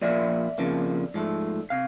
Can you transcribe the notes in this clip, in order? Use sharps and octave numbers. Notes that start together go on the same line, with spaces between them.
A#2 F3 A#3 D5 E5
F2 C#3 F3 A#3
G#2 F3 A3
C3 F5